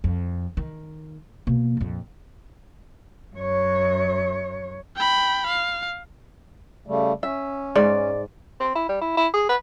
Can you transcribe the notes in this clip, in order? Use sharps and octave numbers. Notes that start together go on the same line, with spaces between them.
F2
D#3
B2 A#3
A#1 F2
F#2 C#5
G5 B5
F5
C#3 G3 A3
C#4 E5
G#2 D5
C4
E4
G3
E4
E4
G#4
B4